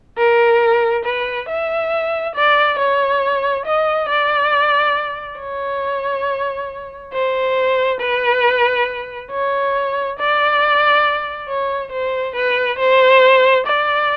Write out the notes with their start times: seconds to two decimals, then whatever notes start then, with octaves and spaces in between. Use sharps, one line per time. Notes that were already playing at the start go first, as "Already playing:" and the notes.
0.17 A#4
1.05 B4
1.48 E5
2.35 D5
2.79 C#5
3.66 D#5
4.09 D5
5.40 C#5
7.14 C5
8.00 B4
9.31 C#5
10.19 D5
11.49 C#5
11.92 C5
12.36 B4
12.79 C5
13.67 D5